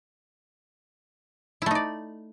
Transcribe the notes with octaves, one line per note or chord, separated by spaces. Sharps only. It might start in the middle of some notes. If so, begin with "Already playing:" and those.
A3 D#4 E4 D5